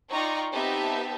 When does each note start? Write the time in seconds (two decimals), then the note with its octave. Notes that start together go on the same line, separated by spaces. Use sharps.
0.12 D#4 F4 D5 G5 A#5 C#6
0.52 B3 C4 D#4 G4 E5 A5